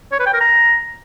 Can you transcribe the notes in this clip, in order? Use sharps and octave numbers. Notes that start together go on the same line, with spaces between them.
C#5
B4
G5
A#4
A#5